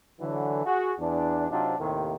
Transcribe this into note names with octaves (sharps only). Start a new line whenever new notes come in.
D3 E3 F#3
F#4 G#4
E2 D4
C3 F#3 C4 D4 D#4 F4
D#2 A2 C3 D#3 A#3